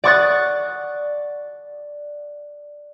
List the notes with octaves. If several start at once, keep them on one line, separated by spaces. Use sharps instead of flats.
D5 F#5 C#6 D#6 F#6 A6